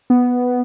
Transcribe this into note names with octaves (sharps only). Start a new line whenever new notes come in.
B3